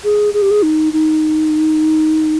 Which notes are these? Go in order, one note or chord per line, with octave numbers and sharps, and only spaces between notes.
G#4
G#4
G4
G#4
D#4
D#4